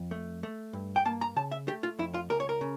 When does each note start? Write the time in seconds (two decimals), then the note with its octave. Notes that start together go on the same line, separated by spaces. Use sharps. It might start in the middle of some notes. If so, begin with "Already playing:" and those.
Already playing: F2
0.11 A3
0.43 A3
0.73 G2
0.96 G5
1.05 A#3 A5
1.21 A#5
1.36 C#3 A5
1.51 E5
1.68 A3 G4
1.83 F4
1.99 F2 E4
2.14 F4
2.30 C#2 A#4
2.40 C#5
2.49 A#4
2.61 C#3